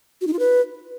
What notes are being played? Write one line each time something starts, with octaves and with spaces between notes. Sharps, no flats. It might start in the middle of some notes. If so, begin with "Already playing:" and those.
F#4
D#4
F4
B4